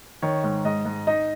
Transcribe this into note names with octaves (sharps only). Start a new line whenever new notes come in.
D#3 C#5
G#2
G#2 D#5
G#2
D#4 D#5